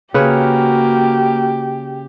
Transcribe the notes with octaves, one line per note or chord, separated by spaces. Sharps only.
C#3 A#3 F#4 G4 B4 C#5